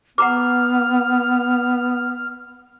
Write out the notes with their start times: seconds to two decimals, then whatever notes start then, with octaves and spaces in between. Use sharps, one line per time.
0.18 B3 F#5 A#5 D6 F6